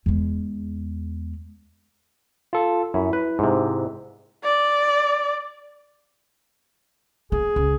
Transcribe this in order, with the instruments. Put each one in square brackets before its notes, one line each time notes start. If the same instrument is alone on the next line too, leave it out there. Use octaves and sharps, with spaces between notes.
[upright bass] E2 G#3
[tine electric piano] F4 A4
[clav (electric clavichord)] F#2 [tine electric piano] E4
[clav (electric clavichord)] B4
G#2 C3
[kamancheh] D5
[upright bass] A#3 [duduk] G#4
[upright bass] C#2